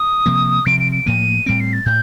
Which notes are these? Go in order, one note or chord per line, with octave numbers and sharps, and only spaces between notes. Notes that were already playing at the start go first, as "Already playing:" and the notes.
Already playing: D#6
C3 F3 A#3
C3 F3 C4 D7
D7
D7
A2 F3 A#3 D#7
A2 G3 C4 D7
C7
A6
A2 G6